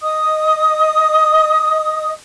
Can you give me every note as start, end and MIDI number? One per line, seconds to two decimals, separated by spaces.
0.01 2.11 75
0.01 2.11 87